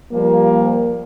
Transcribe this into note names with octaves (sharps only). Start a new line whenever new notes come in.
F3 G3 A#3